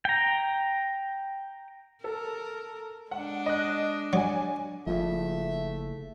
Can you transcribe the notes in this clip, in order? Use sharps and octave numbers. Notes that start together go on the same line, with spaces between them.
G5 A#5
A4 A#4
G#3 D4 F#5
D#5 F#6
F#3 D5 G#5
F#1 F3 A3 E5